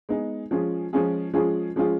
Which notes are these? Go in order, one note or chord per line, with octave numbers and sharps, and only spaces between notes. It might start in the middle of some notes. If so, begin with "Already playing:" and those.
G#3 B3 D#4 G#4
F3 G#3 C#4 F4 G#4
F3 G#3 C#4 F4 G#4
F3 G#3 C#4 F4 G#4
F3 G#3 C#4 F4 G#4